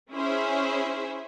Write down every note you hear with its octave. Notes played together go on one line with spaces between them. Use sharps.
C#4 E4 G#4 C5 E5